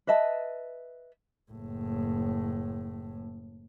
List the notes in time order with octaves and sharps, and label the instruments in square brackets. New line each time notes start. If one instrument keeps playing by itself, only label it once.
[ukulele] B4 D#5 E5 A5
[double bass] F#1 A2